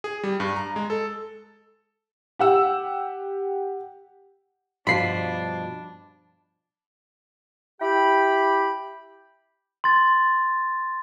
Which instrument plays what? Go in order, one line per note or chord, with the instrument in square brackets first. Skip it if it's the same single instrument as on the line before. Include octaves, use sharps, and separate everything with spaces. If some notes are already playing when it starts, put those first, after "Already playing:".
[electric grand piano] G#4
G3
G2
A#5
G#3
A4
[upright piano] G4 F#5 E6
[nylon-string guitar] G2 B2 F4 [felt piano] F3 F#4 [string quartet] D4 [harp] B5 C7
[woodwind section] E4 G4 G5 B5
[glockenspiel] C6 A6